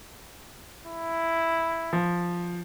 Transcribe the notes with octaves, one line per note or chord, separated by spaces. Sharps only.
E4
F3